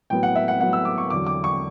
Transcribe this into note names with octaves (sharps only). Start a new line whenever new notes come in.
A2 F#3 B3 G5
F#5
E5
F#5
A2 F#3 B3 F#5
E6
D6
C#6
E2 D3 F#3 D6
D6
C#6